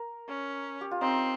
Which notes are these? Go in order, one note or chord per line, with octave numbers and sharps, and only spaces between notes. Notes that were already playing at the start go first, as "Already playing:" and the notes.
Already playing: A#4
C#4
G4
F4
C4 D#4